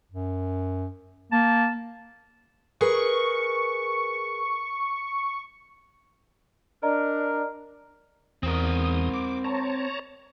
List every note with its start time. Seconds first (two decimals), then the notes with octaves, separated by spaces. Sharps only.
0.12 F#2
1.32 A#3 A5
2.81 G#4 A#4 B4 C#6
6.83 D4 A#4 D5 D#5 A#5
8.43 E2 C4 A#4 D#6
9.13 D6
9.44 C#5 A5 A#5